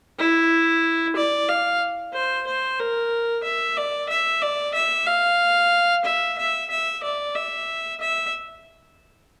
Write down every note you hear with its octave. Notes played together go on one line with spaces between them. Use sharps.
E4
D5
F5
C5
C5
A#4
E5
D5
E5
D5
E5
F5
E5
E5
E5
D5
E5
E5